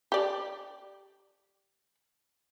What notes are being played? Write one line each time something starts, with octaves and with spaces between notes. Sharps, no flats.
G4 D5